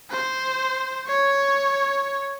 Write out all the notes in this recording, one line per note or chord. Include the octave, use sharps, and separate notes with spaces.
C5
C#5